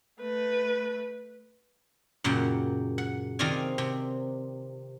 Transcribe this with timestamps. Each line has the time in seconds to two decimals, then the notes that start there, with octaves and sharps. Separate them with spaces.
0.22 A3 B4
2.24 F#2 A#2 C#3 F#5 G5
2.98 F#5
3.39 C3 D#3 C4 F4 D5 G#5
3.78 C3